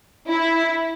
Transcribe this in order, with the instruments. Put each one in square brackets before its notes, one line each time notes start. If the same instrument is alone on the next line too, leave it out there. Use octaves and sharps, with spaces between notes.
[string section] E4